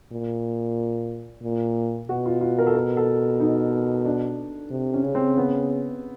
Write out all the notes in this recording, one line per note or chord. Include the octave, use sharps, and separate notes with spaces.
A#2
A#2
B2 F#4
F4
F4
A#4
A4
A#4
A4
D#4
D4
C3
C#4
C#3
C4
B3